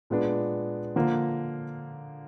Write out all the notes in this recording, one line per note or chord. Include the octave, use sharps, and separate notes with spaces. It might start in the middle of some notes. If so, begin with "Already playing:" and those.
A#2 G#3 B3 D4
D3 F3 A#3